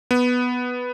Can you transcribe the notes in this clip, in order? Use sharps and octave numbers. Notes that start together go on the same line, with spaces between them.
B3